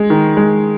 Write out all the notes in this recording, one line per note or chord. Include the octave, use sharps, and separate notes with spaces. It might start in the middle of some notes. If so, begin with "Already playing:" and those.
Already playing: G#3
D#3
G#3